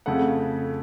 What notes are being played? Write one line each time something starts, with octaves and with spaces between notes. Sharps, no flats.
F2 C#3 A3 F#5